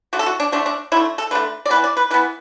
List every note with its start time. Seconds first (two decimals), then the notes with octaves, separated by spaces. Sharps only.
0.13 D3 A3 F#4
0.19 A4
0.26 F#4
0.40 D4
0.52 D3 A3 D4
0.66 D4
0.92 D3 E4
0.96 A3
1.18 A4
1.31 D3 A3 B4
1.66 D5
1.70 E3 B3 B4
1.84 D5
1.97 B4
2.11 E3 B4
2.14 B3